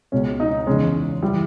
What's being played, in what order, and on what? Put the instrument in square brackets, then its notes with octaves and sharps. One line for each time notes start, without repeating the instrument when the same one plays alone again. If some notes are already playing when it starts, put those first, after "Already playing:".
[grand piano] C#2 B2 G#3 C#4
D#4
E2 C#3 G#3 C#4
E3 G3